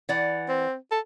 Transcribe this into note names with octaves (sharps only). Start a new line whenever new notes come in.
E3 D5 F#5
C4
A4